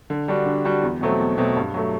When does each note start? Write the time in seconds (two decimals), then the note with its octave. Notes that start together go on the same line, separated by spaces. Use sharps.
0.10 D3
0.28 G3 D4 F#4
0.46 D3
0.65 G3 D4 F#4
0.83 E2
1.01 B2 F#3 A3 C4
1.20 E2
1.38 B2 F#3 A3 C4
1.56 G2
1.74 F#3 A3